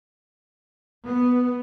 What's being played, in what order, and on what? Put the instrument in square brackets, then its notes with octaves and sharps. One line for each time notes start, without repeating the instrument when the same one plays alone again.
[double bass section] B3